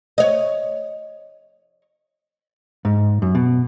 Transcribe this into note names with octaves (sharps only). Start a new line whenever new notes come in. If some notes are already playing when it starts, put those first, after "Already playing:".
C#5 D#5
G#2
F#2
B2